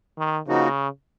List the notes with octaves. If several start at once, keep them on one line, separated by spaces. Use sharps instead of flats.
D#3
C#3 F3 A#3 D#4 F#4